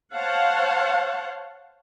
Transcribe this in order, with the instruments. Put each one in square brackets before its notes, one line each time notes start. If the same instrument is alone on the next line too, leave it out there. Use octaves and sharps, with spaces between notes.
[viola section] C5 C#5 F5 F#5 A5